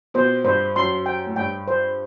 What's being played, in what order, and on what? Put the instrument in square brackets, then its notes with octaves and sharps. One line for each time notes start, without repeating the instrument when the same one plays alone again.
[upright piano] B2 [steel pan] C5
[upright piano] G2 [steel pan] C5
[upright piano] F#2 [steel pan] C6
[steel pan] G5
[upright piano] A2
[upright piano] G2 [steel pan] G5
[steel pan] C5